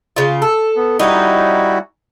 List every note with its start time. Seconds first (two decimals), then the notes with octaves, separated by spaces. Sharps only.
0.16 C#3 F4
0.42 A4
0.76 B3
0.99 G3 C#4 D#4 E4 F#4